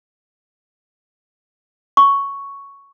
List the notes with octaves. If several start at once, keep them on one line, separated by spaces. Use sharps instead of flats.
C#6